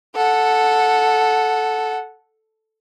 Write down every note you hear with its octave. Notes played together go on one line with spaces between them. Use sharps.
A4 F#5